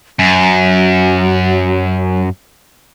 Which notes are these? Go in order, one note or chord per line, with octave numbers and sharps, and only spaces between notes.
F#2 F#3